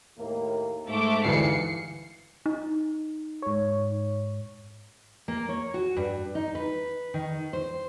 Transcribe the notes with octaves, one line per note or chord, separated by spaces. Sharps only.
D#2 A2 A#3
G#2 A3 D6
D2 G2 E3 C7 C#7
D#4
G#2 C#5
A#3
C#5
F#4
G2
D#4
B4
D#3
C5